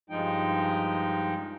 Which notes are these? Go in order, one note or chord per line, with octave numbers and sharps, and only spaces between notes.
G2 F3 G#3 D#4 G5